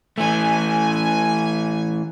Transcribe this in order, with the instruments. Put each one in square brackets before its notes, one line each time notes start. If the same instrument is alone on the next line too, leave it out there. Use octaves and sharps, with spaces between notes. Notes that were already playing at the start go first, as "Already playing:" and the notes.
[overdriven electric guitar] E3 A3 [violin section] G#5